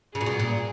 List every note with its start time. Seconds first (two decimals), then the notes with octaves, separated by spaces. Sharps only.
0.14 C#3 G#4
0.21 A#2
0.26 B2
0.40 A#2